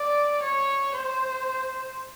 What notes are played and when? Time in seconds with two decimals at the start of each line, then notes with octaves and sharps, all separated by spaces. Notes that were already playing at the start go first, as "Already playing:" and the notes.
Already playing: D5
0.42 C#5
0.95 C5